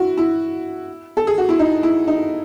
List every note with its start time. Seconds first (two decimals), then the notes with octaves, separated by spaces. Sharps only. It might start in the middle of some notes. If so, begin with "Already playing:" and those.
Already playing: E4 F#4
0.17 E4
1.17 A4
1.27 G#4
1.38 F#4
1.49 E4
1.59 D#4
1.83 E4
2.08 D#4